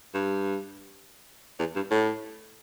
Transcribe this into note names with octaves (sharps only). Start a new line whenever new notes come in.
G2
E2
G2
A2